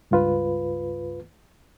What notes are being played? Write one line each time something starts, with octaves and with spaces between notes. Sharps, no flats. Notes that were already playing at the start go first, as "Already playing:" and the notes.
C#2 G2 F4 B4